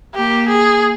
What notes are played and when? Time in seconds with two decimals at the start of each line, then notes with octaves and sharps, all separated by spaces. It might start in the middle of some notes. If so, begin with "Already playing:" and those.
0.15 A#3 G4
0.48 G#4